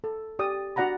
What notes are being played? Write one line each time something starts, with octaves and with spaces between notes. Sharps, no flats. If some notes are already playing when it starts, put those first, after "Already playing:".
A4
G4 D5 D#6
D4 F#4 D5 F#5 A#5 B5